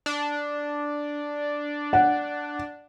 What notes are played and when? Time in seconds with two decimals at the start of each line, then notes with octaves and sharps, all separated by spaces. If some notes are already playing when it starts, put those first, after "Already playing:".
0.06 D4
1.93 F#5